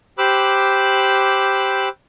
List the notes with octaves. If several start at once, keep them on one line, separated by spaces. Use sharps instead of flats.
G4 C5 B5 D6 E6 F#6